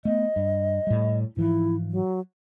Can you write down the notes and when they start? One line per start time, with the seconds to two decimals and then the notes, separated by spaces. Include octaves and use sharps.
0.05 A3 B3 D#5
0.36 G2
0.87 A2 G3
1.37 G#2 E3 F3 E4
1.91 F#3